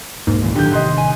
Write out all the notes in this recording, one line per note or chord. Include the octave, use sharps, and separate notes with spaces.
E1 B1 G#2 A#3
C#2 A#2 E3
D3 D#3 F#3 G4 G6
A1 C3 D#3 D#5 C6 F#6
G#5